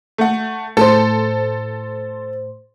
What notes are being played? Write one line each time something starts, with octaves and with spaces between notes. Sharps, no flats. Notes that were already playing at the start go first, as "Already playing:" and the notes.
A3 F#5
A2 A4 C5